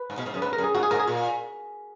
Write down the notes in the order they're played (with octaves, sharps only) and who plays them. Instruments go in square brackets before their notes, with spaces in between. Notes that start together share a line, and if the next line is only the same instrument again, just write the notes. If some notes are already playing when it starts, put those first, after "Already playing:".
Already playing: [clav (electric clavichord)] B4
[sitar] G#2
B2
G#2
F#2
[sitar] G#2 [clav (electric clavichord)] B4
[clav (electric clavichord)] A#4
[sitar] F#2
[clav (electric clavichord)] G#4
[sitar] G#2 [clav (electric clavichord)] F#4
[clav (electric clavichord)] G#4
[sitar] G#2 [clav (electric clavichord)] A#4
[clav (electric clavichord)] G#4
[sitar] A#2